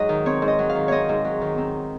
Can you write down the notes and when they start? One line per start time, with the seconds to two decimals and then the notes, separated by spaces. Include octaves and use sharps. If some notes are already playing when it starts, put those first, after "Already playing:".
Already playing: G#2 F#3 D#5
0.09 D#3
0.26 C4 C#5
0.42 G#2
0.48 D#5
0.59 F#3
0.69 F5
0.75 D#3
0.88 C4 C#5 D#5
1.09 G#2
1.25 F#3
1.41 D#3
1.58 C4 A#4